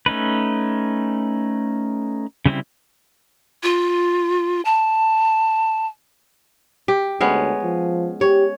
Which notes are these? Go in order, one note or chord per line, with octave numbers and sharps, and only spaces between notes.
A3 C#4 D#4 B4
C#3 G3 C4 E4
F4
A5
G4
D2 G#3 B3 C#4
F3
G4 C#5